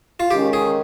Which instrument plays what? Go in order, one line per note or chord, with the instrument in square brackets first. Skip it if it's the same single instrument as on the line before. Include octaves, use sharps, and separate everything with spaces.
[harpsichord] F4
[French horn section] D#3 G#3 C#4 [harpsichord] G4
[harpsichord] G#4